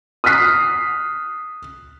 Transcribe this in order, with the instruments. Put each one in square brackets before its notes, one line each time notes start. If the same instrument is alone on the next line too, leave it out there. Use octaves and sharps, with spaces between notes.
[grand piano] D#6 F6 F#6 B6 C7